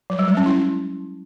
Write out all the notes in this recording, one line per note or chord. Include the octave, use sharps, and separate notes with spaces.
F#3
G3
G#3
C#4
E4